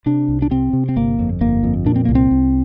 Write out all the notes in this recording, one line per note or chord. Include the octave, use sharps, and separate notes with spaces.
C3 D4
C2
D4
C3 C4
C3
C4
G1 A#3
F2
G1 A#3
F2
A#2 D4
C4
C2 A#3
C4
C2